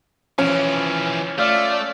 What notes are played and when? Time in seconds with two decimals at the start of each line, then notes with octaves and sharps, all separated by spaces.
0.38 E3 F3 C#4
1.39 A3 F4 D5